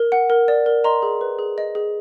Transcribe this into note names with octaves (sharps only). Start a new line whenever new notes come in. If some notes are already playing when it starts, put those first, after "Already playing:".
Already playing: A#4
F#5
A#4
D5
A#4
D#5 A#5 C6
G#4
B4
G#4
D#5
G#4